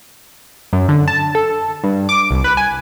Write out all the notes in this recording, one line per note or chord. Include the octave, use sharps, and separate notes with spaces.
F#2
D3
A5
A4
G2
D6
C2
B4
G#5